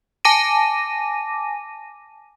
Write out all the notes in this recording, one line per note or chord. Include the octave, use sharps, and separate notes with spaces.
G#5 A5 D6 A#6 D#7